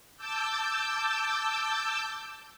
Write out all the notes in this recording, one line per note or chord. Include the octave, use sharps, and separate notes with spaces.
A5 D6 E6 G6